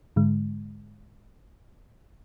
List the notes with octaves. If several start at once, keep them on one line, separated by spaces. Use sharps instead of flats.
G#2 D3 G#3